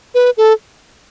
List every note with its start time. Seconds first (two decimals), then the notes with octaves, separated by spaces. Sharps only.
0.14 B4
0.37 A4